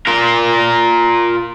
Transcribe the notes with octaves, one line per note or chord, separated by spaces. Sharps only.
F4 A#4